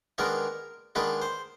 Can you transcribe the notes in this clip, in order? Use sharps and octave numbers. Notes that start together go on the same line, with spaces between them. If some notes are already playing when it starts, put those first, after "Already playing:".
D#3 G#3 B3 D4 A#4
D#3 G#3 B3 D4 B4
C5